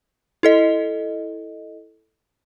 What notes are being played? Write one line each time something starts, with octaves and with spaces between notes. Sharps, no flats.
E4 A4 D#5